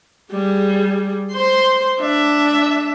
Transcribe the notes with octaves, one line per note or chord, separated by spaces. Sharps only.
G3 G#4
C5 C6
D4 E5